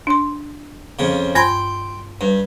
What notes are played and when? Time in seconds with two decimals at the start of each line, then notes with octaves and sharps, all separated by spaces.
0.07 D4 C6
0.99 F2 C#3
1.35 G2 G5 B5 C6 G#6
2.21 G2